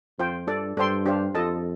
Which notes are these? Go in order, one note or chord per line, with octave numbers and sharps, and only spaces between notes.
F2 F4 C5 G5
G2 D4 A4 D5
G2 D4 A4 C5 G5 C6
D4 G4 C5 F5
F2 F4 A4 D#5 A5